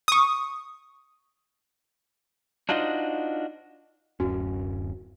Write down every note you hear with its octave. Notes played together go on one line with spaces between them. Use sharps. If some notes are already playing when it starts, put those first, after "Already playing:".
C#6 D#6
D4 D#4 F4 F#4 C5 D#5
D1 F#2 C#4 F#4